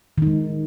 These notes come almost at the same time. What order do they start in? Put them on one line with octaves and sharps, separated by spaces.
D#3 D#4 G#3